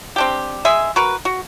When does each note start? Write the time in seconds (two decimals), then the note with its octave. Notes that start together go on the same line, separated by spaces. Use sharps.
0.16 C4 D4 G4
0.65 G#3 G#4 E5
0.96 F#4 A#4 B4
1.25 F#4